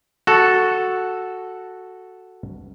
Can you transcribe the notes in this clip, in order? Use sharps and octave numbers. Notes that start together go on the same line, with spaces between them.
F#4 A4